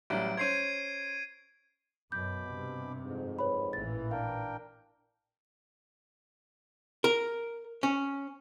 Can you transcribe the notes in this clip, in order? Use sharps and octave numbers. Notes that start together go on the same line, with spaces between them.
A1 F#3 G3 D7
C#4 C5 G#6 C7 D#7
F#2 B2 B5 D6 G6
G2 C3
F2 G#2
B4 C#5 B5
A1 A#2 E3 A6
D4 A#4 F5 G5
A#4
C#4